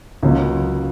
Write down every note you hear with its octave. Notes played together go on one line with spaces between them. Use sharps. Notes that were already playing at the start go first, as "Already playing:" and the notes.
C#2 C#3 F#3 A#3